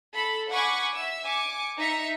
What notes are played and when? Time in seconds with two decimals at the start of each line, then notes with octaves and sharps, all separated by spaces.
0.14 A4 B5
0.50 F#5 G#5 B5 C#6 D6 G#6
0.94 E5 E6
1.26 G#5 D6 C#7
1.77 D#4 E5 A#5 C#7